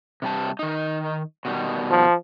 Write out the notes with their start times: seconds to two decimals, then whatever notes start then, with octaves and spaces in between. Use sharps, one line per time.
0.22 C3 G3 A5
0.59 D#3 D#4
1.45 B2 D#3 G3
1.91 F3